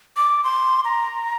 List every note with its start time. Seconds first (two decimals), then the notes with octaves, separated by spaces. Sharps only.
0.17 D6
0.44 C6
0.85 A#5